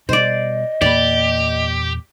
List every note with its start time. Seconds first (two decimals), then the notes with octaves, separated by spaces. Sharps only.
0.09 B2 G3 C5 D5 D#5
0.81 E2 A#2 A#3 G4 D5 B5